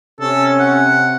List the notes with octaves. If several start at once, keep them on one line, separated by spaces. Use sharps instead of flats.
C3 C#4 A4
F#5